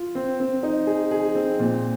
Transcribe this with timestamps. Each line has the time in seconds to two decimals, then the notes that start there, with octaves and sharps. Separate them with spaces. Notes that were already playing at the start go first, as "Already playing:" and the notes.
Already playing: F4
0.15 C4
0.40 C4
0.63 D#4
0.87 G#4
1.11 G#4
1.35 C4
1.59 A#2